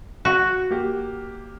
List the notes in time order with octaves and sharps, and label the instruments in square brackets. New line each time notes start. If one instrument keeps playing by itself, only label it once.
[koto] F#4
[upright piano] A#3 G4